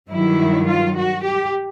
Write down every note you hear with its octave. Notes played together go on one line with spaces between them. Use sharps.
G2 D#3 F#3 E4
F4
F#4
G4